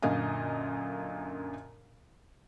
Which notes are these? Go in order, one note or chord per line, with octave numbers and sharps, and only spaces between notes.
F#2 A#2 D3 D#5 F5